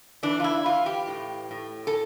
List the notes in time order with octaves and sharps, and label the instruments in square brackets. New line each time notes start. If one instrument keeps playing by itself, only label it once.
[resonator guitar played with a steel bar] E3 D4
F4
E4
E3 F4
G4
A2
A2
A4